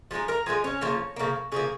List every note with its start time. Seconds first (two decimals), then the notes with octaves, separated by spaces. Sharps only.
0.11 F3 G#3 D#4 G#4
0.28 A#4 A#5
0.46 F3 G#3 D#4 G#4 G#5
0.64 C#4 C#5
0.81 C#3 F3 A#3
1.16 C#3 F3 A#3
1.52 C#3 F3 A#3 G#4